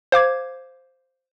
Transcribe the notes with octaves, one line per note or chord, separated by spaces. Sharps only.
C5 F5 D6 G#6